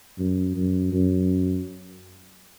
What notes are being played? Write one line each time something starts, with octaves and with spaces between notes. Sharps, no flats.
F#2
F#2
F#2